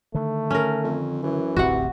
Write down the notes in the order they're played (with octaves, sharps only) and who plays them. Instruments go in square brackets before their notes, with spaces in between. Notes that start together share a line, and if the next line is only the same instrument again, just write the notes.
[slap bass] D3 D#3 [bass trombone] A3
[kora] C#4 A#4
[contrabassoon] F2
[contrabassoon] F#2 [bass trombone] E3
[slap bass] D1 A1 E2 [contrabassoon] C3 [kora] F#4 F#5